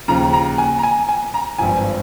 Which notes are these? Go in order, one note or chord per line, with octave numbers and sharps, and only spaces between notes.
D#2 C#3 F3 A#5
A#5
A#5
G#5
A#5
G#5
G#5
A#5
G#1 G2 F3 G#5